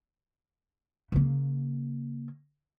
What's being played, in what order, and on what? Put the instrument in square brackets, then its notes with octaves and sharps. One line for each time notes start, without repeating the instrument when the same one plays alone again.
[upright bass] C#3 A#3